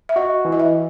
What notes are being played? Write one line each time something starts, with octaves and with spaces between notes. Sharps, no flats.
E5
F#4 D#5
E3
D#5
E5